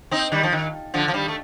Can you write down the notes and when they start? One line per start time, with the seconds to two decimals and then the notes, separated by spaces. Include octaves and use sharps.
0.11 C4 D#4
0.32 D#3 G3
0.43 F3
0.53 D#3
0.94 D3 F3
1.08 F3
1.14 D#3 G3
1.28 A3